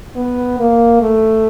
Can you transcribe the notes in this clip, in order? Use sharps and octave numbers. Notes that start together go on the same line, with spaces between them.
B3
A#3
A3